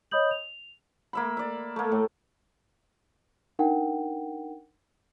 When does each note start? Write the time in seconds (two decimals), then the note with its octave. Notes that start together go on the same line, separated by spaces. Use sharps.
0.11 C#5 D#5 B5 D#6 G6 F#7
0.31 F7
1.13 A#3 E5 B5
1.37 D5 E5
1.76 A3 A#3
1.92 A2
3.59 D4 D#4 A#4 F#5 G5